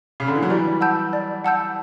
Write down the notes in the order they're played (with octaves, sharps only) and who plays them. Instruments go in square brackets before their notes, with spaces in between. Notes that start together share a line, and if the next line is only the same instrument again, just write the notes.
[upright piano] C#3
D3
E3
F#3
[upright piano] E3 G3 [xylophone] D5
[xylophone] F#5 A5 E6 G6
D5
F#5 A5 E6 G6